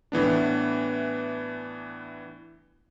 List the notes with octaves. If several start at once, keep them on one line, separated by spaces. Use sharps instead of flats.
A2 E3 B3 D4